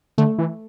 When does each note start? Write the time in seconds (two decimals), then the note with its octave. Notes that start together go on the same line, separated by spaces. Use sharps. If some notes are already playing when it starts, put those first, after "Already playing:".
0.18 D3 A3
0.38 E3